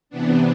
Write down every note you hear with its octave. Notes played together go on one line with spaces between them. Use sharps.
C3 E3 B3 D4